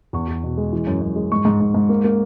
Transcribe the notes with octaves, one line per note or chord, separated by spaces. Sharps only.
E2 C#6
E2
B2
G#3
E3
F#2
F#2
G#3
G#2 C#6
G#2
G#2
G#2
A#3
A#3